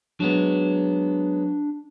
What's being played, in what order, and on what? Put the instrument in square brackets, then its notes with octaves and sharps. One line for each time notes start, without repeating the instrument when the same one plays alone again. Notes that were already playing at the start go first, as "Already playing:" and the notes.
[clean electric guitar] F#3 G#3 B3 [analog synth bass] D4